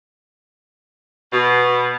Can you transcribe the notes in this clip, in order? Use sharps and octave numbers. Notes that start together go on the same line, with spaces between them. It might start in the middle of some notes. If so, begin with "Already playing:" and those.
B2